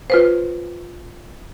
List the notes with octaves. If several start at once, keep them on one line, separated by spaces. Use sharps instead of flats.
F4 B4 C5